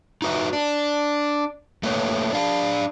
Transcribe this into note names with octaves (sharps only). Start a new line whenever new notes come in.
D#4 F#4 B4 E5
D4
A3 A#3 B4 C#5
D4 F5